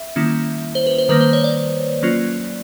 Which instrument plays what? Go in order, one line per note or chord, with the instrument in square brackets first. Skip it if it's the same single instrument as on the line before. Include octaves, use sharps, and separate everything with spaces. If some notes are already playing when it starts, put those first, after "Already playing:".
Already playing: [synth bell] E5
D#3 G3 A#3 C#4 E4
C5
B4
C5
D#3 G3 A#3 B4
C5
C#5
D5
F#3 A#3 C#4 F4